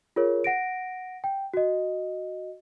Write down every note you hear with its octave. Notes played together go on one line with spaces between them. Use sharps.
F4 G#4 A#4 C#5
F#5 A#6 D7
G5
F#4 D#5